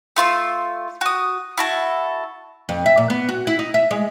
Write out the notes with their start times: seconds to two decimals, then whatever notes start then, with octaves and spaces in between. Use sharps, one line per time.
0.16 A3 F4 C6 E6
1.01 F#4 D#6
1.58 E4 F#4 A4
2.69 F2
2.86 E5
2.97 A#2
3.10 B3
3.29 F#4
3.47 E4
3.59 D#4
3.74 E5
3.91 G#3